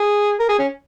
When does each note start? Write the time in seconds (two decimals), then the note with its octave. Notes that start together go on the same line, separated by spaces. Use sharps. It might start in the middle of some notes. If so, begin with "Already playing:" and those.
Already playing: G#4
0.39 A#4
0.49 G#4
0.59 C#4